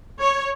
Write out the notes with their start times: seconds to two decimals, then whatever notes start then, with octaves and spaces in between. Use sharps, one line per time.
0.20 C#5